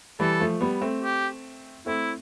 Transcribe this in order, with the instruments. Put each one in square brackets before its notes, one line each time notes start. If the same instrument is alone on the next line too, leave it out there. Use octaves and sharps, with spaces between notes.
[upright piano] E3 G3 [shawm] A4
[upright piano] F3 A3
G3 B3
A3 C4
[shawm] G4
[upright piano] A3 C4 [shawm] E4